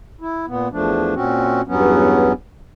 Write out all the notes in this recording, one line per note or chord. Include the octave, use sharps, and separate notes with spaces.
E4
A#2 B3
E2 F3 A3 D4
A#2 C4 C#4 F#4
E2 G2 F#3 B3 C#4